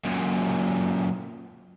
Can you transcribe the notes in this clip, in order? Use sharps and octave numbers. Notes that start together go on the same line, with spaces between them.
F#2 A#2